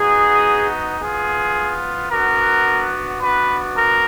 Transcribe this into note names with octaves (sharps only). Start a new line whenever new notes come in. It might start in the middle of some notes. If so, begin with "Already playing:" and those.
Already playing: B3 D#4 F#4 G#4
B3 F4 G#4
B3 D4 F#4 A#4
B3 D4 F#4 B4
A#4